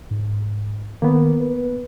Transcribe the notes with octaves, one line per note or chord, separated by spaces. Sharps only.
G#2
D#3 A#3 B3 A#4
B4